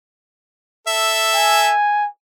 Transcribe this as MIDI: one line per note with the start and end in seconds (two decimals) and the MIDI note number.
0.87 1.71 69
0.87 1.71 76
1.34 2.07 80